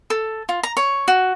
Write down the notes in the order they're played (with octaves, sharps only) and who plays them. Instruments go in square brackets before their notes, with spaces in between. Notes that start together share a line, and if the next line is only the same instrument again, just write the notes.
[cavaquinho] A4
F4
A#5
C#5
F#4